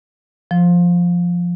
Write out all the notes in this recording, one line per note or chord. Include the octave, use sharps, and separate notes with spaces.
F3